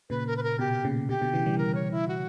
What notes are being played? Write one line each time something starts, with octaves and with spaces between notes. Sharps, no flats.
A#2 C#3 B4
A#4
B4
A#4
B2 G4
A#2 C#3
B2 D3 G4
B2 D3
C#3 E3
E3 G3
A#4
C#5
E4
F#4